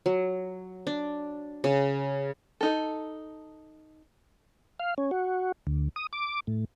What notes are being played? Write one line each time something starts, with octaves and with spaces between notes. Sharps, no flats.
F#3
D4
C#3
D#4 A4
F5
C#4
F#4
D2
D#6
D6
A2